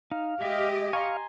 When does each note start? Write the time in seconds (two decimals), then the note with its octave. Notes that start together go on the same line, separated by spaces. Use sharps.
0.11 D#4 F5
0.41 G#3 G4 D#5 E5
0.93 F5 G#5 A#5 C6 C#6